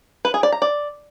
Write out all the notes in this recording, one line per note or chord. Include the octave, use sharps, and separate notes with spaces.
B4
G#4
D5
A#5
D5